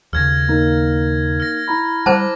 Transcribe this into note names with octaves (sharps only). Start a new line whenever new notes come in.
D#2 C#3 F6 G#6 A#6
A#3 D#4 A#4
F6 A#6
E4 A#5 B5
G3 C5 A5 D6